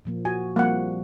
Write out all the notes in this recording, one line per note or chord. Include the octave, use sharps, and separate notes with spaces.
A#2 F3 A#3
F#4 G#5
F3 G3 A#3 C4 F#5